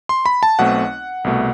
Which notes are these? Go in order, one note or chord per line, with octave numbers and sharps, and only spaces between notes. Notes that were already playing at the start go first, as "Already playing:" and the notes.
C6
B5
A5
B1 B2 A3 C4 F#5
C2 B2 A3